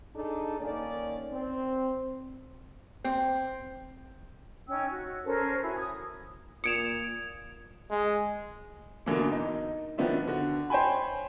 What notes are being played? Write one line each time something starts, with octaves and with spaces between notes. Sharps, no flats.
D4 D#4 G#4 A4
D#3 A#3 C#4 D5
C4
C4
C#4 D#4 G5 E6
F#4
C#4 A4 A#4 C5
E4 F#4 G#5
D#6 G#6
A#2 D#6 G#6 C#7 D7 E7 F7
G#3
B2 D3 E3 A#3
D#4
D#3 F3 B3 D4 E4
D3 F#4
C5 C#5 G5 G#5 B5